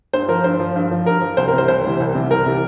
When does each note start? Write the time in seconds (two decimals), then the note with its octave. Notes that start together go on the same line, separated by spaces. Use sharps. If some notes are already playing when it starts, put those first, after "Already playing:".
0.13 G2 C5
0.28 F3 A#4
0.44 G2 C5
0.60 F3
0.76 G2
0.91 F3
1.06 G2 A#4
1.22 F3
1.37 C2 C5
1.48 A#4
1.53 C3 E3 G3 C5
1.68 C2 C5
1.84 C3 E3 G3
2.00 C2
2.15 C3 E3 G3
2.30 C2 A#4
2.46 C3 E3 G3